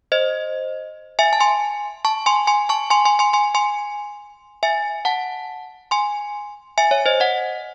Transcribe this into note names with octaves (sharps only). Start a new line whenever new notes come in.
C5 D#5
E5 G#5
A5
G#5 C6
A5 C#6
G#5 C6
G#5 C6
A5 C#6
G#5 C6
G#5 C6
G#5 C6
G#5 C6
G#5 C6
E5 G#5
F#5 A5
G#5 C6
E5 G#5
C#5 E5
C5 D#5
D#5 F#5